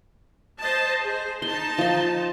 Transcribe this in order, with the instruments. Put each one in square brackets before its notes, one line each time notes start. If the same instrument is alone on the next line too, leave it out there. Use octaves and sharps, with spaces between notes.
[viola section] C5 D#5 A5
G#4 C5
[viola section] D#4 A5 [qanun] C6
[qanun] F3 C6